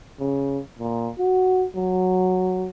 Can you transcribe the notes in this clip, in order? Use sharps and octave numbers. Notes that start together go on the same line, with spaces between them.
C#3
A#2
F#4
F#3